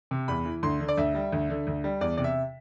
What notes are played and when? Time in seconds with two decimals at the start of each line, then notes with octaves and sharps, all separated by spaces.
0.11 C3
0.28 E2 B5
0.45 E3
0.63 D2 C6
0.80 D3
0.88 D5
0.97 D2 E5
1.15 G3
1.32 D2
1.50 D3
1.67 D2
1.84 G3
2.01 E2 D5
2.17 C3 D5
2.24 E5